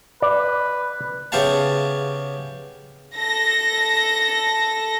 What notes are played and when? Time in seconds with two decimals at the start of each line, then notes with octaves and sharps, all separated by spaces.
0.22 B4 D5
1.32 C#3 B3 G4 E5 F5 A5
3.15 A4 A#6